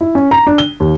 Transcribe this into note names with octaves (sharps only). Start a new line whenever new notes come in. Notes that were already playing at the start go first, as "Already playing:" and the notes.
E4
C#4
A#5
D4
G7
D#2